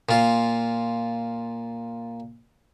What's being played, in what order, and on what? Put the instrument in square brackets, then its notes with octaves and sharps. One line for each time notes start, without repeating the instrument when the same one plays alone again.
[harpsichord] A#2 F4